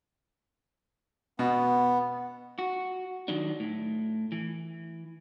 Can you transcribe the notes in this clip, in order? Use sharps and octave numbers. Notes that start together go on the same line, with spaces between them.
B2 B3
F#4
D#3 F#3 D4
A2
E3